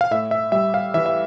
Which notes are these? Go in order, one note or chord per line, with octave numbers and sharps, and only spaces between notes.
F5
A2 E5
E5
G3 E5
F5
E3 E5
E5